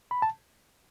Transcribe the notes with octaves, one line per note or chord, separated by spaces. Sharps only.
B5
A5